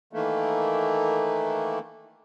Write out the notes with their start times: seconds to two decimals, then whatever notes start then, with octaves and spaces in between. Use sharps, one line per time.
0.13 D#3 E3 A3 A#3